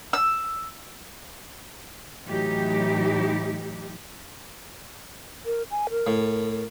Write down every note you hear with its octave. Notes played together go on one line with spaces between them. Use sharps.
E6
A2 E3 F#3 D#4 G4
A#4
G#5
A#4
A2